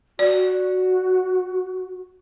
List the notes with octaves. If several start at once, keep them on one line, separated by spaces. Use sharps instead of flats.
F#4 D5